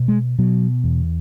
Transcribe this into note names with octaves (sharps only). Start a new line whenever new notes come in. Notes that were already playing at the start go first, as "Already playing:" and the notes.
Already playing: B2
G#3
B2 F#3
E2